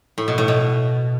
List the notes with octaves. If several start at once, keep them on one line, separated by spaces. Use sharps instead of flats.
A2
B2
A2
B2